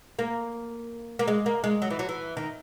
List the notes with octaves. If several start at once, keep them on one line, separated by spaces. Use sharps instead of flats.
A#3
A#3
G#3
A#3
G#3
F#3
E3
F#3
E3
D#3